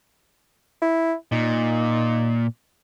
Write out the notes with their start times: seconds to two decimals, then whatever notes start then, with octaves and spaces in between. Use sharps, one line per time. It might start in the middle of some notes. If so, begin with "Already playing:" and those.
0.82 E4
1.32 A#2 D#4